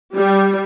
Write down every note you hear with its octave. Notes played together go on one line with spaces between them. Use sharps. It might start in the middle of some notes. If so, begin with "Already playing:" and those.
G3